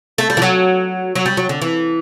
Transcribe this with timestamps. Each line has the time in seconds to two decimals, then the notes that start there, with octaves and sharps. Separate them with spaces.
0.18 A3
0.30 G3
0.37 E3
0.42 F#3
1.15 F#3
1.26 G3
1.37 F#3
1.49 D3
1.61 E3